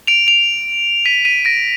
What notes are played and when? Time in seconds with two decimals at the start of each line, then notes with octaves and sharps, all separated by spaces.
0.07 D7 F7
0.27 D7 F7
1.05 B6 D#7
1.25 B6 D#7
1.45 A#6 D7